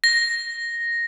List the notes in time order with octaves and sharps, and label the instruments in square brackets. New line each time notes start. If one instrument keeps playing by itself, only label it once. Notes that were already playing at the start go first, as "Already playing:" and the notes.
[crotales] A#6